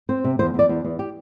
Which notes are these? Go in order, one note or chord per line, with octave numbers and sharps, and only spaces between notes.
C4 C5
C3
E2 C5
E2 D5
E2
E2
G4